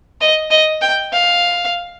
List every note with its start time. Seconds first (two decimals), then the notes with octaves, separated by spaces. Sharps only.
0.21 D#5
0.51 D#5
0.82 G5
1.13 F5